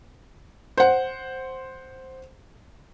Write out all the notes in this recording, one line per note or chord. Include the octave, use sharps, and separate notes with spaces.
C5 F#5